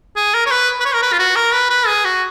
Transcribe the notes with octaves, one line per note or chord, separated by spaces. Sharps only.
G#4
A#4
C#5
B4
B4
C#5
A#4
B4
F4
F#4
A#4
B4
B4
G#4
F#4